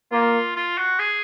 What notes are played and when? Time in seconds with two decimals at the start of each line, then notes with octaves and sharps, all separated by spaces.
0.12 A#3 F4
0.56 F4
0.78 F#4
0.99 G#4